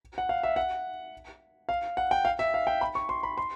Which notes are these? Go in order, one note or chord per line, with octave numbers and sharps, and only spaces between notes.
F#5
F5
E5
F#5
F5
F#5
G5
F5
E5
F5
G5
B5
C#6
C6
B5
C6